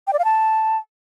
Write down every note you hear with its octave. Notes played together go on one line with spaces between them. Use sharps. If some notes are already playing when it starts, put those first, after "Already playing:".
G5
D5
F5
A5